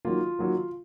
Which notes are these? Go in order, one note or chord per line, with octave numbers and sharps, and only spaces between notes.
D#3 F#3 A#3 F4
D#3 F#3 A#3